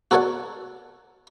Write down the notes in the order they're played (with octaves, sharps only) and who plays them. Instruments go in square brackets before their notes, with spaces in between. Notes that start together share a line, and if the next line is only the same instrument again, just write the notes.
[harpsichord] F#4 A4 A#4 C#5 D5 F#5